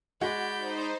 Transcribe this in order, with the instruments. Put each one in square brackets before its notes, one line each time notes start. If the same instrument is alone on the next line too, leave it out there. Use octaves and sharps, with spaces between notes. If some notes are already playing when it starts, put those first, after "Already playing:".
[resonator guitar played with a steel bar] G#3 [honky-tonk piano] F#4 [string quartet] D5 B5 G6
[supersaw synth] D#4 C5